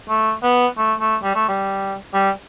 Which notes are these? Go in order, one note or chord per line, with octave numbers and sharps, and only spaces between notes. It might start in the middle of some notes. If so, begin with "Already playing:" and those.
A3
B3
A3
A3
G3
A3
G3
G3